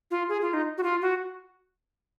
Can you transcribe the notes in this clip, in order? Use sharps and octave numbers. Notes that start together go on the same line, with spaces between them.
F4
G#4
F4
D#4
F#4
F4
F#4